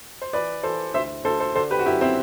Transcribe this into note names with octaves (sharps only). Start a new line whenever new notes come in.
C5
E3 B4 D5
E3 A4 C5
D2 C5 E5
D2 A4 C5
A4 C5
D3 A4 C5
G4 B4
F#4
F#2 E4 G4
C4 E4